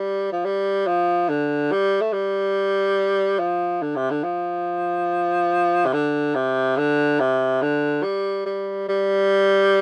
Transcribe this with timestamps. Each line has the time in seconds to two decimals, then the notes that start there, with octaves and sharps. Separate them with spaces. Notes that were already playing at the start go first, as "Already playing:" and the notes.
Already playing: G3
0.32 F3
0.45 G3
0.87 F3
1.29 D3
1.71 G3
2.01 A3
2.13 G3
3.39 F3
3.82 D3
3.96 C3
4.10 D3
4.24 F3
5.86 C3
5.93 D3
6.35 C3
6.77 D3
7.20 C3
7.62 D3
8.03 G3
8.45 G3
8.88 G3